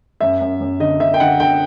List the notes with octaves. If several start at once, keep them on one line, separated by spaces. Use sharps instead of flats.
F#2 E5
F#2
F#2
D3 D#5
D3 E5
G5
D3 F#5
D3 G5